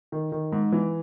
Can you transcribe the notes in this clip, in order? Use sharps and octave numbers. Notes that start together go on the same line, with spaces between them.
D#3
D#3
G#2
E3